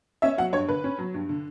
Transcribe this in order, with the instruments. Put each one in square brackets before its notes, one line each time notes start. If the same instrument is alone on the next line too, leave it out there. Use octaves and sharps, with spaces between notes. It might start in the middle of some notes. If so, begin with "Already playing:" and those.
[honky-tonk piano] C#4 E5
F#3 F#5
G2 C#5
D3 B4
C#4
F#3
G2
D3